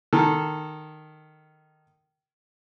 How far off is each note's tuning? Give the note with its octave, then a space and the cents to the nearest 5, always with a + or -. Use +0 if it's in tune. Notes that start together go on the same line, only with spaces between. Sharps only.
D#3 -10 A4 +0